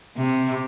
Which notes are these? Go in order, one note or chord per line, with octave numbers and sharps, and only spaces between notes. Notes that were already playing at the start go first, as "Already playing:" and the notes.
C3